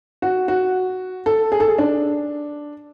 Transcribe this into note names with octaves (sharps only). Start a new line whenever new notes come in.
F#4
F#4
A4
G#4
A4
G#4
D4